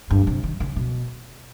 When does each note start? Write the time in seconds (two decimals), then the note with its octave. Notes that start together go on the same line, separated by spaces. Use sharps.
0.10 G2
0.27 C3
0.43 D#3
0.60 C#3
0.76 B2